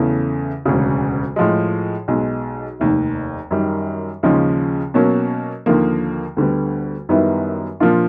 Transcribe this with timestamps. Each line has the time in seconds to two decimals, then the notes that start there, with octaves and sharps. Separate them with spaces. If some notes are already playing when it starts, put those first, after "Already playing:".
Already playing: E2 C#3 E3 A3
0.66 E1 D2 C#3
1.36 A2 F3 G#3
2.08 B1 B2 G#3
2.80 F1 D#2 D#3
3.51 F#2 D#3 G3
4.23 D#2 C#3 F3 G#3 C#4
4.94 B2 F#3 A#3 C#4
5.66 D#2 D3 F3 A#3
6.37 D2 D3 G3 B3
7.09 F#2 D#3 G3 B3 E4
7.80 A#2 F3 A#3 D4 F4